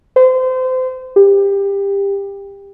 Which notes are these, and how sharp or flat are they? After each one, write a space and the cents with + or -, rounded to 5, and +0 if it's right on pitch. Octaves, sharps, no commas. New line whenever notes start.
C5 -30
G4 +20